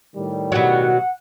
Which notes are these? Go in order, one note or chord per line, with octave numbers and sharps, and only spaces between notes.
A2 D#3 G3
B2 F#3 F#5